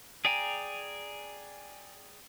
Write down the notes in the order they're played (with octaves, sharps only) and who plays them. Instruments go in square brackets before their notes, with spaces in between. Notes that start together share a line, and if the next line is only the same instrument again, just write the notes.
[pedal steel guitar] G#4 D5 G5 G#5 A#5